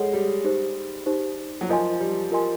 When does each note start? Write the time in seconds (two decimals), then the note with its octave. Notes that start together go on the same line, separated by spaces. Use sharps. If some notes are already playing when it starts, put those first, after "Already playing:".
Already playing: G#3 A4 C#5 F#5
0.13 G3
0.44 D#4 G4 C5
1.06 D#4 G4 C5
1.61 F#3
1.69 F3 F4 A#4 D#5 G#5 C6
2.00 G3
2.31 F4 A#4 D#5 G#5 C6